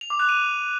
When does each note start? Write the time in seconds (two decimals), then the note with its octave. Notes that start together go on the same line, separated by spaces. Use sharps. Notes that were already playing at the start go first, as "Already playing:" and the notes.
0.01 F7
0.10 D6
0.20 F#6
0.29 D#7